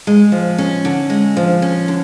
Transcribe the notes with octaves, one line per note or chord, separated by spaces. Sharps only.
G#3
F3
C#4
D3
G#3
F3
C#4
D3